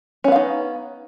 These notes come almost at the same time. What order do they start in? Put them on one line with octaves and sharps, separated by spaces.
C#4 B3 F5 D#4